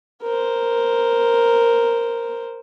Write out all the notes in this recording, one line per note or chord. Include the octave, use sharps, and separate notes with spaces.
A#4 C5